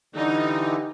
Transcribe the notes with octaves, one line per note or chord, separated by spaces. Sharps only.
D3 E3 G3 D#4